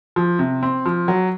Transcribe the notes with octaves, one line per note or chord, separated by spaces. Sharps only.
F3
C3
C4
F3
F#3